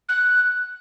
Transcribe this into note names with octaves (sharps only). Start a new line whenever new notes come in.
F#6